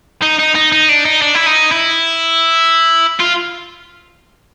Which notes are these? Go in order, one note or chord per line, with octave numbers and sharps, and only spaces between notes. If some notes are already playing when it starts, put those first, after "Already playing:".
D#4
D#4
D#4
D#4
D4
D#4
D4
E4
D#4
E4
F4